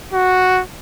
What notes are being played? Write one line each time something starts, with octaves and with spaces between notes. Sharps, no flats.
F#4